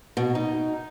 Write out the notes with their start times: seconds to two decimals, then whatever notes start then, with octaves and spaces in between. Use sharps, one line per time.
0.17 B2
0.35 D#4